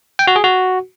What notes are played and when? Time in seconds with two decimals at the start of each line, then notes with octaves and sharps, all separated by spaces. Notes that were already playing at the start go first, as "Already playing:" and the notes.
0.19 G5
0.27 F#4
0.36 G#4
0.44 F#4